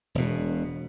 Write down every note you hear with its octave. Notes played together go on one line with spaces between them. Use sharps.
E1 B2